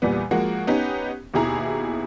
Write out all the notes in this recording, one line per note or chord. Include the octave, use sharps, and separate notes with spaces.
E2 A#2 G3 B3
F3 G#3 A#3 F#4
B3 C#4 D#4 G4
D#2 B2 E4 G#4 A#5